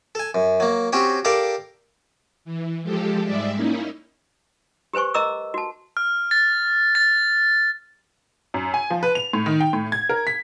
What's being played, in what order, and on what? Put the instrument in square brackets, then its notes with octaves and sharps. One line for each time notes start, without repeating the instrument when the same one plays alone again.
[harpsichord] A4 G#5
F#2
F#3 A#3
C4 C#4 F#4 G4 C#5
G4 A4 A#4 D5 F5
[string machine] E3
F3 G#3 G4 A4
G#2 G3 G#3 D5 E5
A#3 C#4 D#4 E4
[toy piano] G4 B4 C5 G#5 C#6
A#4 D#5 A#5 D6 E6
F#4 A5
[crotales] F6
A6
A6
[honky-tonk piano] F#2
G#5
F3
B4
F7
A2
D#3
G5
A2
G#6
A#4
B6